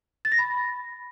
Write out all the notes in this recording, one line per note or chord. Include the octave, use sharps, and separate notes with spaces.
A6
A#6
B5